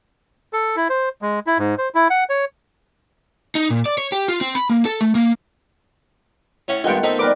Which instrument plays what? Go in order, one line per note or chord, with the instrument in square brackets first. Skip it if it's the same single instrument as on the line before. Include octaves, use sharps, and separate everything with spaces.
[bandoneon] A4
E4
C5
G#3
E4
G#2
C5
E4
F#5
C#5
[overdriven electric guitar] D#4
A#2
D5
C#5
G4
F4
C4
B5
A#3
A4
A3
A#3
[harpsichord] A2 C#4 F#5
[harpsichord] G2 G#3 [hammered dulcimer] D#3 A3 B3 [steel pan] F4 F#5 G5
[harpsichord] C4 D#4 B5 [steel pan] A4
[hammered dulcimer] G3 A#3 D5 [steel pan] A#4 B4 D6